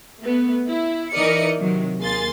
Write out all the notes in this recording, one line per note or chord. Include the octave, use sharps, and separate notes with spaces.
A3 B3
E4
E3 D#4 A#4 D5 D#5 C#7
C3 D#3 F#3
D#2 A#3 G#4 C6 A6